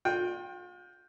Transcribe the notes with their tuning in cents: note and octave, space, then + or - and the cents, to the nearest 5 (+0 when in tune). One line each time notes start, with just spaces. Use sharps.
F4 +40 G5 +0